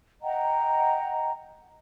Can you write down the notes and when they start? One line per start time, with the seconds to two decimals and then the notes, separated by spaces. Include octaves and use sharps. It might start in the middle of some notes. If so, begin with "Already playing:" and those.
0.22 D#5 F#5 G5 A#5